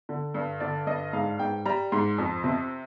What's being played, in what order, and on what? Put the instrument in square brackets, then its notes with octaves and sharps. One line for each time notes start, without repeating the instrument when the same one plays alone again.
[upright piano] D3
G2
D3 D5
G2 D#5
G#2 F5
G#2 G5
G3 A#5
G#2 C6
F2
C3